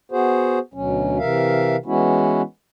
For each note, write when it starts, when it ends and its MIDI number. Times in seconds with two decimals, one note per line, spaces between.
0.11 0.59 59
0.11 0.59 66
0.11 0.59 68
0.11 0.59 72
0.74 1.18 38
0.74 1.18 47
0.74 1.18 54
0.74 1.18 61
1.18 1.76 48
1.18 1.76 52
1.18 1.76 70
1.18 1.76 76
1.18 1.76 77
1.86 2.42 52
1.86 2.42 56
1.86 2.42 59
1.86 2.42 61
1.86 2.42 64
1.86 2.42 66